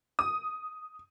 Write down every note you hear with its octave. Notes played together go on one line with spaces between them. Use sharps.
D#6